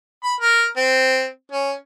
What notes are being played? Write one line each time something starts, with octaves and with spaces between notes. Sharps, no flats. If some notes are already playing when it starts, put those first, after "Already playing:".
B5
A#4
C4
C#4